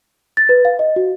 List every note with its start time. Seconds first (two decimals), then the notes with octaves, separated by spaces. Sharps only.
0.37 A6
0.49 B4
0.65 F5
0.79 D#5
0.96 F#4